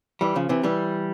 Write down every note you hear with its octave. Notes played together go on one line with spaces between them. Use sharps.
E3 G3
C#3 F3
C3 E3
E3 G3